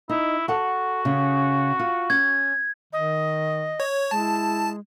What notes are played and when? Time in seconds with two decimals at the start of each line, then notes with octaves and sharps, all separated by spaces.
0.09 D#4 E4
0.48 F#4 A4 F#5
1.05 C#3 C#4
1.80 F4
2.10 C#4 G#6
2.93 D#3 D#5
3.80 C#5
4.11 G#3 E4 A5